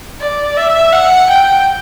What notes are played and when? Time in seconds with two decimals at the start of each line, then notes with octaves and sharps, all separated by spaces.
0.21 D5
0.57 E5
0.92 F#5
1.29 G5